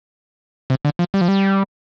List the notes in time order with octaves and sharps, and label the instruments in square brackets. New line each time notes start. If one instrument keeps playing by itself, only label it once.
[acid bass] C3
D3
F3
G3
F3
G3